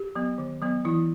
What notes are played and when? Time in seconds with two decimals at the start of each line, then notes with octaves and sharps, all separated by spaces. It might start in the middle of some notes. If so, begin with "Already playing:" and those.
Already playing: G4
0.15 F#3 B3
0.38 D#3
0.62 F#3 B3
0.85 E3 E4